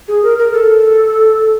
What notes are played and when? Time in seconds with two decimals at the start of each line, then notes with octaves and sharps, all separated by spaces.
0.08 G#4
0.23 A#4
0.38 A#4
0.54 A4